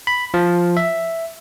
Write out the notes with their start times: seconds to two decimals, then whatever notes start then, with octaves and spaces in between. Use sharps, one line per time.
0.07 B5
0.34 F3
0.77 E5